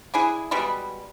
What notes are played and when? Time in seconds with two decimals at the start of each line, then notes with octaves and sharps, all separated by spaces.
0.14 D4 E4 G#4
0.51 B2 G3 G#3 B5